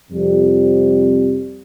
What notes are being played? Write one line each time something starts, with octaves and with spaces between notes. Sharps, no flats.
F2 C3 G3